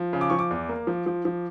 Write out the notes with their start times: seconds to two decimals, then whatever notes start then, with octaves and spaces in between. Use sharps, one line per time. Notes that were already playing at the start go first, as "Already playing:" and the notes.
Already playing: F3
0.13 C#3
0.21 D6
0.30 F3 C#6
0.39 D6
0.50 E2
0.69 A#3
0.87 F3
1.06 F3
1.25 F3